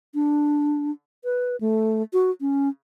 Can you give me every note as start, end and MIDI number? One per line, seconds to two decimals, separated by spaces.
0.14 0.91 62
1.24 1.56 71
1.61 2.03 57
2.13 2.31 66
2.41 2.69 61